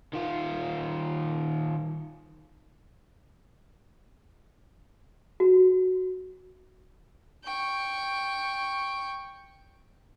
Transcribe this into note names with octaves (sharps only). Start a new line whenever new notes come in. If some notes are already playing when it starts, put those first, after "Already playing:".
D#3 F4
F#4
G5 C#6